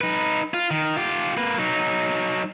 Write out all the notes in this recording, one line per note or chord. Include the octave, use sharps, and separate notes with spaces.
D#4 B4
F4
D#3
F4 G4
A#3 B4
F#3 D#4